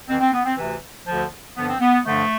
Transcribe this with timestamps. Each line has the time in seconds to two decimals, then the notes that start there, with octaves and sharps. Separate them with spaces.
0.08 F2 E3 C4
0.21 C4
0.33 B3
0.45 C4
0.58 D2 C3 E3
1.07 D2 D3 F3
1.57 G2 D3 F3 B3
1.69 C4
1.81 B3
2.06 G2 D3 F3 A3